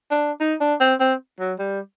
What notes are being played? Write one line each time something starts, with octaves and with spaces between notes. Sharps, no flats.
D4
D#4
D4
C4
C4
F#3
G3